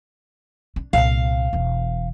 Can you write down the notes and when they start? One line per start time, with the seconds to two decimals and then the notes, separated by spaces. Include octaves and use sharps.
0.76 D4
0.93 C2 A#2 F5
1.53 E1 E3